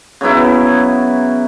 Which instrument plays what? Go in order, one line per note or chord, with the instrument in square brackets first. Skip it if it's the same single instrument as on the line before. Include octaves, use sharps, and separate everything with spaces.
[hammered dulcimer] C#3 F#3 B3 E4